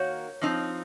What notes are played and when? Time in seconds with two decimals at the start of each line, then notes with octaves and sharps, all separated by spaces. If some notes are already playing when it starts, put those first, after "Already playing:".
Already playing: D#3 A#3 D#4 F#4 C#5
0.41 F3 C4 D#4